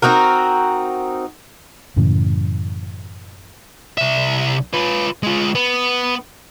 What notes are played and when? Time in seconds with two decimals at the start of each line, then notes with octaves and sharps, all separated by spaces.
0.02 C4 D#4 F#4 A#4
1.96 F#2 A2 C#3 E3
3.98 C2 E5
4.74 F4 B4
5.23 G#3 F4
5.55 B3